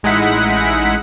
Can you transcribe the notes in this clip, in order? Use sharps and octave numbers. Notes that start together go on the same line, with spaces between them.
A1 G#3 D#4 E4 F#5 B6